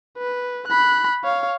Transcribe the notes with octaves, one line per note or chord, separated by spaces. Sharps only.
B4
B5 F#6
C#5 F5